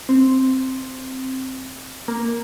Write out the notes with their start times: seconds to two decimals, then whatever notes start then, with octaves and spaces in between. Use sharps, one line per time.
0.09 C4
2.08 A#3